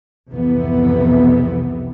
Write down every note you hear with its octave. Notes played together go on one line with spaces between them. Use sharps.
C2 F2 G#2 C3 E3 B3